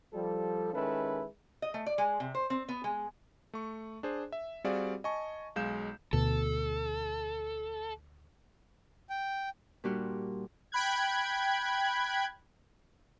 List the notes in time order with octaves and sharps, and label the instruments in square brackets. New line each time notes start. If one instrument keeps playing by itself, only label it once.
[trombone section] F3 G3 A4
D#3 G#3 C#4 E4 A4 B4
[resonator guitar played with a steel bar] D#5
A3
D5
G#3
C3
C5
C4
B3
G#3
[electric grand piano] A3 C#6
D4 G#4 C5
E5
G3 C4 F#4 G#4 D5 F5
D#5 G#5 A5 C#6
B1 G#3 F5 G6 E7
[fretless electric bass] D2 B2 [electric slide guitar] A4
[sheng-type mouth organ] G5
[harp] A#2 G3 D4 F#4 G4 C6
[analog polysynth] G5 B5 F#6 G#6